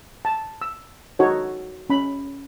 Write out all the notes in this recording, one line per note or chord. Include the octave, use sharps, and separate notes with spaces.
A5
E6
D#4 F#4 A4 C#5
C#4 B5